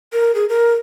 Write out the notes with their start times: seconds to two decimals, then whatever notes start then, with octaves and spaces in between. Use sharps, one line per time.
0.13 A#4
0.35 G#4
0.49 A#4